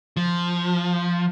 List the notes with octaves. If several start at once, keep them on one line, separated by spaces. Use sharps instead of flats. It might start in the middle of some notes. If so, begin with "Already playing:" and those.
F3